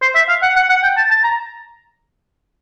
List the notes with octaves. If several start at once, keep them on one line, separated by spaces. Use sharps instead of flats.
C5
E5
F5
F#5
F#5
F#5
G5
A5
A5
A#5